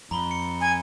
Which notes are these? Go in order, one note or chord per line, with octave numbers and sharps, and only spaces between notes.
F2 A#5 B5 G7
C#7
G#5